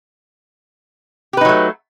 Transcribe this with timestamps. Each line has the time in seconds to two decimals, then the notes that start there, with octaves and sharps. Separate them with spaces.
1.33 G4
1.37 B4
1.41 D#4
1.45 F#3
1.49 A3